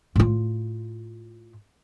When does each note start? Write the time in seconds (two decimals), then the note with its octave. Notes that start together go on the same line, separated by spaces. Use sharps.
0.16 A2 F4